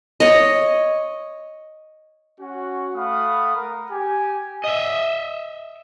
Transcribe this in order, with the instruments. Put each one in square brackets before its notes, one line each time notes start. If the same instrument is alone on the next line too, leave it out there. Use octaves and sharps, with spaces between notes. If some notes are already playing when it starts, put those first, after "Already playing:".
[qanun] C#5 D#5
[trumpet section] C#4 F#4
A3 F5 F#5 B5 D#6
A#4
G4 G#5
[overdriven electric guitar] D#5 E5